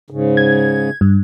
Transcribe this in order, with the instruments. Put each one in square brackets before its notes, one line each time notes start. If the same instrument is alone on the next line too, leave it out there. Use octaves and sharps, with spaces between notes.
[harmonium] G#2 C#3
[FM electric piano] G#6
G2